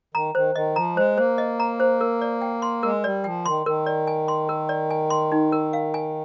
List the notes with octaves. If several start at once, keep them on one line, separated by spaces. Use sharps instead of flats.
D#3 A#5
D#3 C5
D#3 D#5
F3 A#5
G#3 C5
A#3 C5
D#5
A#5
C5
A#4
D5
G5
C6
G#3 A#4
G3 D5
F3 G5
D#3 C6
D#3 A#4
D5
G#5
C6
A#4
D5
G#5
C6
D#4
A#4
F5
G#5